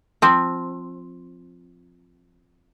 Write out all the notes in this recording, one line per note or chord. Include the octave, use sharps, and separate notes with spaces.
F3 C4